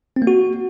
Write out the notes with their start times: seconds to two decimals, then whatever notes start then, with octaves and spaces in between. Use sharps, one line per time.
0.16 C4
0.22 A#3
0.27 F#4